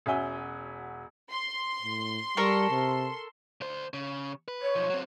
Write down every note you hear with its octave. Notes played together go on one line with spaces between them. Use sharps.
E1 C#4 F#4 E5 G#5 G7
C6
A2
G3 A4 A#4 C#6
C3
D2 C5
C#3
B4
C#5
B1 F3
F#3 C4